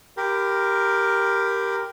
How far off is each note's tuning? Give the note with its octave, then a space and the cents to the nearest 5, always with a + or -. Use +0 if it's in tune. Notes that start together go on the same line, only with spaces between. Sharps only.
G4 +0 A#4 +0 B5 +40